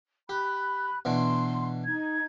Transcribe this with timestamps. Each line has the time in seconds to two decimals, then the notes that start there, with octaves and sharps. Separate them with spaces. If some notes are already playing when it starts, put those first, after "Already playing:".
0.29 G4 B5 F#6
1.05 B2 E3 D4 C6
1.84 D#4 G#6